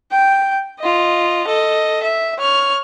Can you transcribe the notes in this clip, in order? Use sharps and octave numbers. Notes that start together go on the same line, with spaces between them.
G5
F4 D#5
A4 D#5
E5
C#5 F6